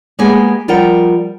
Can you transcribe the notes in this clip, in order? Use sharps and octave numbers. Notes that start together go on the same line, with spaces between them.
G#3 A#3 B3 G4 G#4 G#5
F3 G3 A#4 F#5 G5